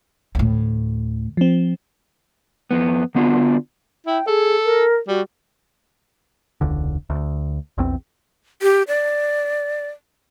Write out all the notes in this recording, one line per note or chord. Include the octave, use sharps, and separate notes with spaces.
D2 A2
F3 C4
F2 B3
D3 B3 D4 F4 F#4
E4 G5
G#4 A4
A#4
G3 F#4
E1 C#2 D3
D2
A#1 E2 C4
G4
D5